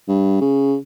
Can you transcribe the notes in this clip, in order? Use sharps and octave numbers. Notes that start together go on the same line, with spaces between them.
G2
C#3